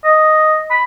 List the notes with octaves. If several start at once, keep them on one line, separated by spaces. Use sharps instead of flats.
D#5
B5